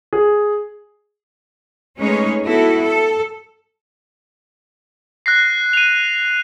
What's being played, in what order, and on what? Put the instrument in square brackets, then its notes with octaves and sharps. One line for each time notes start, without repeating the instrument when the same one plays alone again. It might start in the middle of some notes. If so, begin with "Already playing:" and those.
[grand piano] G#4
[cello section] G#3 A3 C#4 D#4 B4 C#5
B3 E4 F#4 A4
A4
[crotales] F#6 A#6 C7
D#7 F7